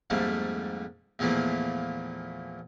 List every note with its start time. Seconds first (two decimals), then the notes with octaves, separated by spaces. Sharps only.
0.10 F2 G#2 G3 A3 A#3
1.19 E2 A#2 E3 F3 A3 A#3